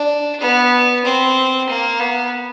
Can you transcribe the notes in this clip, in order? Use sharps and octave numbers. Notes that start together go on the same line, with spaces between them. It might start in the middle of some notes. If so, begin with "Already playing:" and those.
Already playing: D4
B3
C4
A#3
B3